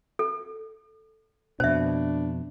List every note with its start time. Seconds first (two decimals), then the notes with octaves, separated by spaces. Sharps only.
0.19 A4
1.60 F2 B2 D4 C5 E5